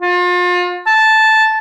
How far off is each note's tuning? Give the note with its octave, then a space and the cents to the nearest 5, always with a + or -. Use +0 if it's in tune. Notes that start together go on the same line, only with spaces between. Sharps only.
F4 +35
A5 -5